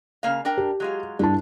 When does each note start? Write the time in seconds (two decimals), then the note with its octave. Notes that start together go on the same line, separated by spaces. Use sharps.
0.23 C#3 A#3 F5
0.45 D4 A#4 G5
0.57 G4
0.80 F#3 G#3 F4
1.19 G2 D3 E4 A5